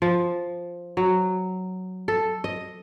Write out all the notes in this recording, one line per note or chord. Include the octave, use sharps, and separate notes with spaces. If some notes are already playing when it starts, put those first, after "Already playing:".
F3
F#3
A4
D#5